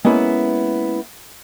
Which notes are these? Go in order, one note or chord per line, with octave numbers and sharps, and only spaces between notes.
G#3 A#3 B3 C#4 E4